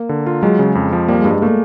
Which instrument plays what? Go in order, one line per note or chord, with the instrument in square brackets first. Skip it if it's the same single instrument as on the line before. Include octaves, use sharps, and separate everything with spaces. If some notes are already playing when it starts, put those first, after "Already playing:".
Already playing: [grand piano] A#3
[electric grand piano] D3
F4
[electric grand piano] F#3 [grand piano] G#3
[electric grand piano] C#3
F2
F3
[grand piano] G3 [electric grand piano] A#3
[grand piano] G#3
[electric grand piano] G2
[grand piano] G#3
[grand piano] A3 [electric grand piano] A#3